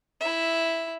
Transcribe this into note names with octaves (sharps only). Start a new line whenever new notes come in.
E4 E5